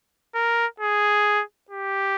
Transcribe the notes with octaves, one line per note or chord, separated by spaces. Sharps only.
A#4
G#4
G4